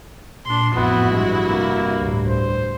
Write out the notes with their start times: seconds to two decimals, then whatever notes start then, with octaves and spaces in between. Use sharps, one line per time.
0.45 A#2 D4 C6
0.75 A1 F2 B3 E4 F#4
1.12 G2 G#3
1.44 C3 A#3
1.97 D2 A2
2.28 C5